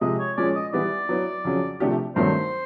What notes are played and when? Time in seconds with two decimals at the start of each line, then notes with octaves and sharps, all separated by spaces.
0.01 C3 F3 G#3 D#5
0.19 C#5
0.37 A#2 F3 G#3 C#4 D5
0.55 D#5
0.73 E3 G3 B3 E4 D5
1.09 F#3 B3 E4
1.45 F2 C#3 F#3
1.80 C3 F3 A3 D4 G4
2.16 G2 D#3 F#3 A3 C4 C5